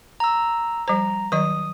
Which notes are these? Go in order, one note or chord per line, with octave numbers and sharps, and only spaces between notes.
A#5 E6
F3 G3 C5 A#5
D#3 F#3 D#5 D#6